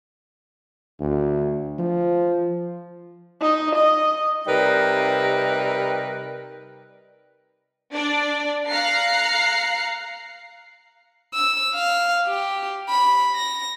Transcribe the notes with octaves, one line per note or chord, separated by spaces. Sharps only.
D2
F3
D#4
D#5
C3 G3 D#4 A#4 B4
D4 D5
F5 A#5 F#6 C7 C#7
E6
F5
G4
B5
A#6